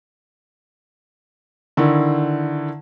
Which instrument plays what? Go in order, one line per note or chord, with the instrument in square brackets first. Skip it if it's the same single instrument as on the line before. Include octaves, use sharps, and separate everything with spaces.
[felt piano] D3 D#3 E4